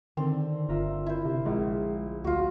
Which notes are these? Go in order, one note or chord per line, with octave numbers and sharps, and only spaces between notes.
D3 D#3 C4
G1 F4 A#4 E5
E4 C5
C3
A#1 G#3
D2 F4 F#4